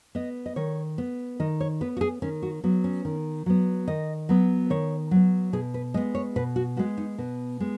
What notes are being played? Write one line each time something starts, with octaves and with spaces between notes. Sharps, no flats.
B3 D#5
D#5
D#3 C#5
B3
D#3 D#5
C#5
B3 B4
F#4
G#4
D#3 C#4
F#4
F#3 B3
C#4
D#3
F#3 B3
D#3 D#5
F#3 B3
D#3 C#5
F#3 B3
B2 G#4
B4
G#3 B3 D#5
C#5
B2 B4
F#4
G#3 B3 F#4
D#4
B2 B3
G#3 B3